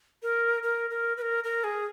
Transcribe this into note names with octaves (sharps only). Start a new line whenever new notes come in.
A#4
A#4
A#4
B4
A#4
A#4
G#4